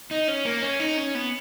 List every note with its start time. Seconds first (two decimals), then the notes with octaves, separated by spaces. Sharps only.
0.11 D#4
0.28 C#4
0.45 A#3
0.63 C#4
0.80 D#4
0.97 C#4
1.15 B3